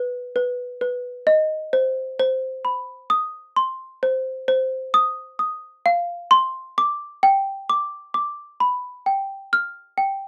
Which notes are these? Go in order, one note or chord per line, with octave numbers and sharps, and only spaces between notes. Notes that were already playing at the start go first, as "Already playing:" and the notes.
Already playing: B4
B4
B4
D#5
C5
C5
B5
D#6
C6
C5
C5
D#6
D#6
F5
C6
D6
G5
D6
D6
B5
G5
F6
G5